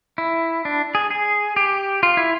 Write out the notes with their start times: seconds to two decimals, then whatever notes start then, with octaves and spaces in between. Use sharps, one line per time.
0.18 E4
0.65 D4
0.95 G#4
1.10 G#4
1.56 G4
2.03 F4
2.17 E4